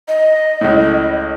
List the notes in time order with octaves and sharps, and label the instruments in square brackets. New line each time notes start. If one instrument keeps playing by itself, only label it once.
[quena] D#5
[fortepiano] C#2 A2